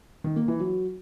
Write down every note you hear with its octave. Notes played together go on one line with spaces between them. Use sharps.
D#3
A#3
E3
F#3